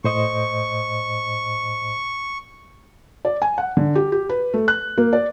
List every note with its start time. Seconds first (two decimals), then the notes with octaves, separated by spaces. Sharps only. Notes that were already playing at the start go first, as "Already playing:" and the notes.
0.04 A2 C5 D#5 C#6
3.25 D5
3.42 G#5
3.58 F#5
3.77 D3
3.95 G4
4.12 G4
4.29 B4
4.54 A3
4.68 F#6
4.98 A#3
5.13 D5